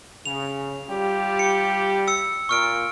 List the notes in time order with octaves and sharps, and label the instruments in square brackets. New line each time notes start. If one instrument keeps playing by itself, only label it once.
[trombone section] C#3 [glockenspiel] F7
[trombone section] G3 F4 G4
[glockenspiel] C#7
E6 C#7
[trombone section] A#2 [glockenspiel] C#6 F6 D7